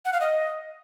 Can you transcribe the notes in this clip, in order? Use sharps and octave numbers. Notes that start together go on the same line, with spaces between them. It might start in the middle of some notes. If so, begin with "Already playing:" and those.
F#5
F5
D#5